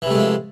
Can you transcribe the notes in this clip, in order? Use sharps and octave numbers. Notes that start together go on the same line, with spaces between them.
C3 E3 F3 G#3 A3